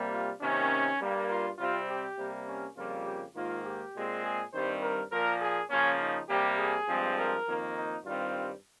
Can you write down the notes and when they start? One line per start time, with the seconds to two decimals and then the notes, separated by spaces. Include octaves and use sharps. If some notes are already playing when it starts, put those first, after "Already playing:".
Already playing: C3 G3 A#3
0.12 F4
0.41 C3 D#3 A#3 C#4
1.00 G2 G3 A#3
1.29 F4
1.58 C3 G3 C4 F4
1.88 G4
2.17 C3 G3 A#3
2.47 C#4
2.76 F2 C#3 G3 A#3 F4
3.05 G4
3.34 G#2 D#3 A#3 F4
3.64 G4
3.94 A#2 G#3 C4
4.23 G#4
4.52 G2 D#3 G3 C4 C5
4.82 A#4
5.11 A#2 F3 A#3 A#4
5.41 G#4
5.70 C#3 F3 A#3 C#4
5.99 D#4
6.29 C3 G3 A#3 G4
6.58 G#4
6.88 G2 F3 G#3 C4
7.16 A#4
7.46 F2 D#3 A#3
7.76 D#4
8.05 G2 D#3 G3 C4 F4